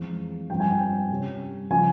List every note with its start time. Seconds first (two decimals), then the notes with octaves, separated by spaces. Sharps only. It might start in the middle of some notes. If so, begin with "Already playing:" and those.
Already playing: F2 E3 G#3 C4 F5
0.49 G2 F3 C4 G5
0.60 G#5
0.71 G5
1.10 C3 G3 C#4
1.71 C#3 F3 C4 G#5